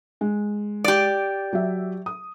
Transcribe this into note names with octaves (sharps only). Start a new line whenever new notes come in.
G#3
G4 D5
F#3 E5
D#6